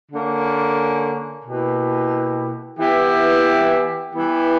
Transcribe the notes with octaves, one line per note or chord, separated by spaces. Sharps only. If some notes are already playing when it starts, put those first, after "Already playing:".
D3 A#3 C#4
B2 A#3 E4 G4
E3 B3 E4 G4
E3 G3 B3 E4 G4